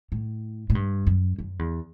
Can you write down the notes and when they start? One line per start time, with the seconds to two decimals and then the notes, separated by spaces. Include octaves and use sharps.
0.12 A2
0.70 A2
0.75 G2
1.07 F#2
1.39 F#2
1.59 E2